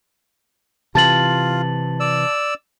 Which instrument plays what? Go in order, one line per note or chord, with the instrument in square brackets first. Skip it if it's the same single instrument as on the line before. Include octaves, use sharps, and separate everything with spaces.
[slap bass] C3 E3 [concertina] F4 [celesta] A5 A6 F#7
[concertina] D5 E6